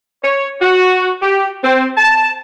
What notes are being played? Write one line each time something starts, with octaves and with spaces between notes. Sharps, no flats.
C#5
F#4
G4
C4
A5